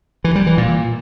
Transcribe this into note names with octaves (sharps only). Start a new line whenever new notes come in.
E3
G3
E3
A#2